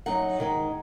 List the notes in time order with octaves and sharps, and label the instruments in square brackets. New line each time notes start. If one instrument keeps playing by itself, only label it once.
[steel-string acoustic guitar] F#2 F#3 D#4 F#5
G#2 D#3 G#3 D#4